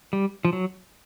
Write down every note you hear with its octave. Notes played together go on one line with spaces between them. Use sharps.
G3
F3
F#3